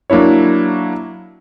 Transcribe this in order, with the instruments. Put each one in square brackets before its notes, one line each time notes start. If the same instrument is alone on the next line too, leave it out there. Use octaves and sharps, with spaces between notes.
[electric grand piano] F#3 A#3 D4 E4 C#5